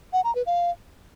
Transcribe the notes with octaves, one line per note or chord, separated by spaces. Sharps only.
F#5
A#5
B4
F5